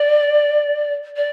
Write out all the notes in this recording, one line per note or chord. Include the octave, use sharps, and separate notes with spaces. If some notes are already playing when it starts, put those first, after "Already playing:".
Already playing: D5
D5